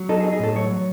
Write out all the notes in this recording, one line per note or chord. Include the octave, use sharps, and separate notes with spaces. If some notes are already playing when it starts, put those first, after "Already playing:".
Already playing: F#3
D#4 A4
G#4
D#4
G#4
A2 A4
F#3 C#5
F#3